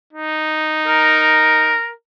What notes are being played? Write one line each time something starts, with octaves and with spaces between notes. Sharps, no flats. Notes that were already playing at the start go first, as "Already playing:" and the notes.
D#4
A#4